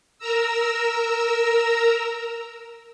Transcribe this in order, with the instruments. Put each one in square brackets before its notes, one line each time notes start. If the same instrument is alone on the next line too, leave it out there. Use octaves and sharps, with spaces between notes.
[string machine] A#4 A#5 E6